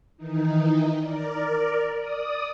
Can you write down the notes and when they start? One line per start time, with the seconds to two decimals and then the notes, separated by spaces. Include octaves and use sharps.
0.17 D#3 E3 D#4
1.00 A#4 D5
2.00 D5 D#6